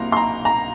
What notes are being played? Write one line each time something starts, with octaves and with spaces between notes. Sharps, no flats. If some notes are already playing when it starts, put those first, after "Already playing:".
Already playing: C2 C3 F#3 A#3 A#5 C6
C6
A#5
A#5